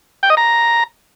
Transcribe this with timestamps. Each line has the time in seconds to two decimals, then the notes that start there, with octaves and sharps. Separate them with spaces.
0.23 G5
0.30 D#5
0.37 A#5